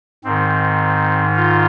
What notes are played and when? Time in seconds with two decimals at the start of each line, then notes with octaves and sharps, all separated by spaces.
0.24 G#2 D#3 C4
1.36 F4